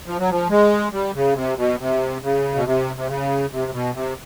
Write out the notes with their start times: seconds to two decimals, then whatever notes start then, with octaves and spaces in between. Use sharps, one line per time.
0.06 F3
0.18 F#3
0.30 F3
0.50 G#3
0.92 G3
1.15 C#3
1.35 C3
1.57 B2
1.79 C3
2.22 C#3
2.54 B2
2.65 C3
2.96 C3
3.07 C#3
3.51 C3
3.72 B2
3.94 C3